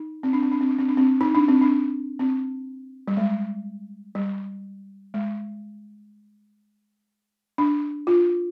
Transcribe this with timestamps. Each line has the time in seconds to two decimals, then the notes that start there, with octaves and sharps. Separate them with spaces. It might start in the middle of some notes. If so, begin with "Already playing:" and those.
Already playing: D#4
0.23 C4
0.33 D4
0.42 C4
0.52 D4
0.61 C4
0.69 D4
0.79 C4
0.88 D4
0.97 C4
1.21 D#4
1.35 D4
1.48 C4
1.61 D4
2.19 C4
3.08 G3
3.17 G#3
4.15 G3
5.14 G#3
7.58 D4
8.07 F4